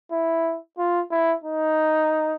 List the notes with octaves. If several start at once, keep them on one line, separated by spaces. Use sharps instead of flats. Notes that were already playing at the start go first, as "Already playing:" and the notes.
E4
F4
E4
D#4